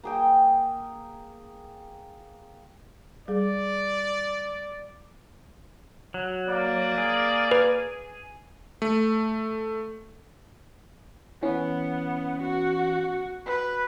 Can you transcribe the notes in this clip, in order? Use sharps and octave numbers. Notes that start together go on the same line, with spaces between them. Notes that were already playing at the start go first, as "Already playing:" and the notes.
A#3 G#4 G5
G3 G#4 D5
F#3
A#3 D5
G#4
B4
A3
E3 B3 C#4
F#4
B4